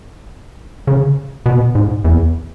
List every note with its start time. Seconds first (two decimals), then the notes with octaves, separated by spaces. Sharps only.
0.87 C#3
1.46 B2
1.75 G#2
2.05 E2